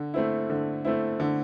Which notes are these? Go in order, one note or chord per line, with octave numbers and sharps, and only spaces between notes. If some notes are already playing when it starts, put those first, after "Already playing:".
Already playing: D3
A3 C4 E4
D3
A3 C4 E4
D3